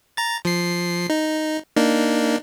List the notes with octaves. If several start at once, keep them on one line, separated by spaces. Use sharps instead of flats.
A#5 A6
F3 C7
D#4
A#3 D4 D#4